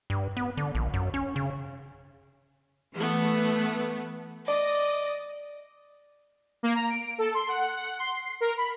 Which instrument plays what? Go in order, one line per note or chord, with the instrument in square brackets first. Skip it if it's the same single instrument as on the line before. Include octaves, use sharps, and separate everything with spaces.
[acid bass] G2
B3
D3
A#1
F#2
C#4
C#3
[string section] E3 A3 B3
[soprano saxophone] D5 [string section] D#5
[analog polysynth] A#3
A#5
D7
A4
C6
F#5
F#5
C6
C7
A#4
B5